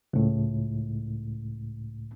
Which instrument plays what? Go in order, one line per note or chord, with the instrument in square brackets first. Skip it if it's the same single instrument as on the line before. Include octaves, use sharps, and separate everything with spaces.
[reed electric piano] C#2 A2